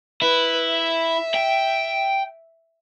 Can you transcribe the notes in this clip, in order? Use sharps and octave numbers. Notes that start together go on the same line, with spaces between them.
E4 B4
E5
G5